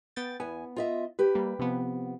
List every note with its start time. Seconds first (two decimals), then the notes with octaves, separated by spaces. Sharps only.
0.16 B3 G5 A6
0.40 E2 B3 G#5
0.76 F4 D#5 E5
1.19 G4 B4
1.35 G3 A#3
1.59 C3 F3 B3